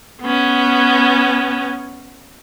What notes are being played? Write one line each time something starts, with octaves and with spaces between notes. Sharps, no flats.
B3 C#4